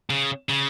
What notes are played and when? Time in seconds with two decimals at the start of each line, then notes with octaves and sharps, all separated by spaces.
0.10 C#3
0.49 C#3